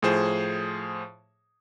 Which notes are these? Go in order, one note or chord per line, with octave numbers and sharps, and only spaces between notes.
A2 F3 G#4 C5 E7